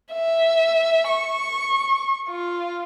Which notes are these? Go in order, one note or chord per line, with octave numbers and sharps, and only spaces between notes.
E5
C#6
F4